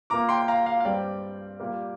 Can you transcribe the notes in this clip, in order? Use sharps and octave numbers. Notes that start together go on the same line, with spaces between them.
A#2 A#3 A#5 D6
G5 C6
F5 A#5
F5
F5
G2 G3 C4 D5 G5
A#2 G3 A#3